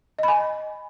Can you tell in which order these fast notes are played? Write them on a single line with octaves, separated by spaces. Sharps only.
D#5 B5 G#5